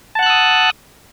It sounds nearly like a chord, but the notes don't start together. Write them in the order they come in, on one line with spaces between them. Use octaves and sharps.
A5 F#5 F#6 E6 D#6